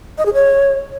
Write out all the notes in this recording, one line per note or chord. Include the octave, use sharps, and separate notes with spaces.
D#5
G#4
C#5